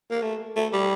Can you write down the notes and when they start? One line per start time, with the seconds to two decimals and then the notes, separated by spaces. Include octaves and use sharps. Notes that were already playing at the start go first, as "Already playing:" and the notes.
0.11 A#3
0.23 A3
0.56 A3
0.73 G3